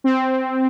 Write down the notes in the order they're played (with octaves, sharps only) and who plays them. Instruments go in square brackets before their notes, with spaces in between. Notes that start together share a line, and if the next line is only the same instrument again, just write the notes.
[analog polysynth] C4